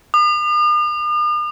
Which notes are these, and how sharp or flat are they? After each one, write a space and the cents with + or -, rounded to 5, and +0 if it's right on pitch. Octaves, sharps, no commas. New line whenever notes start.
D#6 -45